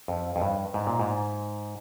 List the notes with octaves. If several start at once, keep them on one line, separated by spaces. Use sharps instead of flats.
F2
F2
G2
G#2
A#2
G#2